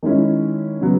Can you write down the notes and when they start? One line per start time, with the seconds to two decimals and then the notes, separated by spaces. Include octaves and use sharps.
0.03 D#3 G#3 C#4 E4
0.81 C#3 F#3 B3